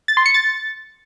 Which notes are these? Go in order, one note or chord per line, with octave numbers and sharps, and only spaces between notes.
A6
C6
C#7
A6